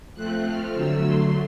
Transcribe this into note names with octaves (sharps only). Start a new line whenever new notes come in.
F3 A3 C4 F#6
F6
D3 F#3 A3 E6
C6